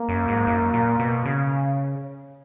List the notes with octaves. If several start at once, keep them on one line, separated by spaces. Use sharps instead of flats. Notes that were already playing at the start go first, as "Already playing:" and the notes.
Already playing: A#3
F#2
G#2
F#2
A#2
B2
C#3